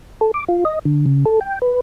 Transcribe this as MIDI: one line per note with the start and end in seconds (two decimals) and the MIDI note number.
0.21 0.31 69
0.34 0.44 86
0.48 0.64 65
0.65 0.79 75
0.85 1.05 50
1.06 1.25 49
1.25 1.39 69
1.41 1.59 79
1.62 1.80 71